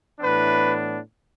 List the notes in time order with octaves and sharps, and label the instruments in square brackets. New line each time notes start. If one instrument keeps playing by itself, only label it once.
[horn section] A2 E3 B3 D4 B4